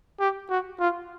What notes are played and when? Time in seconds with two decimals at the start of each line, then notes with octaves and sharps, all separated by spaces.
0.20 G4
0.50 F#4
0.80 F4